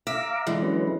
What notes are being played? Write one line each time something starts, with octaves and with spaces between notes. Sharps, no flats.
E5 F5 A#5 D6
D3 E3 G#3
F#3 C#4 B4